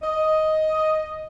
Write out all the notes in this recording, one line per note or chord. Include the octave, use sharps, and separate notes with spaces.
D#5